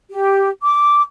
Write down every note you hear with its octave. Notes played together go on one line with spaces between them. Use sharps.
G4
D6